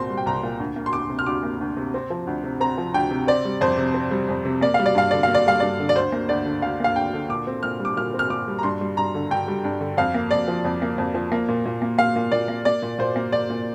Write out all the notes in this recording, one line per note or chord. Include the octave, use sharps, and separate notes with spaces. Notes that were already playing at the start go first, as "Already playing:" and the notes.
Already playing: C2 A#2 C4 C6
G3
G5
C2 A#5
A#2
D2
A#3
C6
D2 D6
C3
F6
D2 D6
A#3
D2
C3
C4
F3
D2
C3
C4 A#5
F3
D2 G5
C3
C4 D5
G3
F2 C5
C3
C4
G3
F2
C3
A#3 D5
G3 F5
D5
G2 F5
D3 D5
A#3 F5
D5
G3 F5
G2 D5
D3
D5
D2 C5
A#3
D2 D5
D3
D2 F5
A#3 F5
D2 G5
D3
A#2 D6
C4
A#2 F6
G3
D6
A#2 F6
C4
F6
A#2 D6
G3
A#5
G2 C6
G3
G2 A#5
D3
G2 G5
G3
G2
D3
F2 F5
A#3
F2 D5
F3
F2
A#3
F2
F3
A#3
A#2
A#2
A#3
A#3 F5
A#2
A#2 D5
A#3
A#3 D5
A#2
A#2 C5
A#3
A#3 D5
A#2